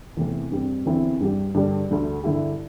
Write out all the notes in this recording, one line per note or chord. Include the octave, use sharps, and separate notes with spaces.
E2 C3 A3 C4 E4
G2 G3 C4
E2 D3 C4 E4
G2 G3 D4 G4
G2 D3 G3 D4
D2 D3 A3
G2 D3 G3 E4 G4